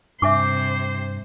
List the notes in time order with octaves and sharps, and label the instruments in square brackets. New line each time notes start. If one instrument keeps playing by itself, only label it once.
[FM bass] G2 [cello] C3 C5 [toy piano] E5 G#5 D6